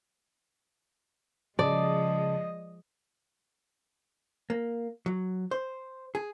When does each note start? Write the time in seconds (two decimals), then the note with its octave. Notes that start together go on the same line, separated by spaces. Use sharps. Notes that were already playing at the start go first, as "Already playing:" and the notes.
1.59 C#3 F3 G#3 D5 D#5 A5
4.50 A#3
5.06 F#3
5.51 C5
6.15 G#4